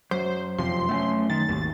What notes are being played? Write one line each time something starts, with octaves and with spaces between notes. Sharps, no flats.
F#2 C5
F1 C3 F3 C6
A3 B3 C#4
D#3 A6
G#1 D#2